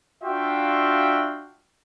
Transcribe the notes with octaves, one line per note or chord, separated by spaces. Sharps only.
D4 F4 F#4 E5 F5 G5